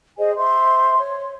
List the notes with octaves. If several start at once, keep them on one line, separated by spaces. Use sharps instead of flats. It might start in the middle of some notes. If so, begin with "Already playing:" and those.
G#4 C5 D#5 G#5
C5 E5 C6
C#5